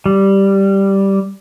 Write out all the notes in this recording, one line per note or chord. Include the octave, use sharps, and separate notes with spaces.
G3